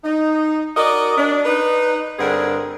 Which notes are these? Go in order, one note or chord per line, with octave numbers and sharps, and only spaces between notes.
D#4
F#4 A#4 D5 D#5
D4
D#4 B4
G2 D3 C4 G#4 A#4 F#5